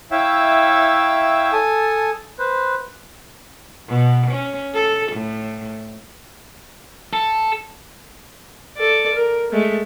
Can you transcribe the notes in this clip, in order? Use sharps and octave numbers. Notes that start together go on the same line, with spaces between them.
E4 C#5 E5 F5 G5 E6
A4 G#5 A5 D#6
B4 C5
B2
C#4
A4
A2
A4
A4 D5
A#4
G#3 A3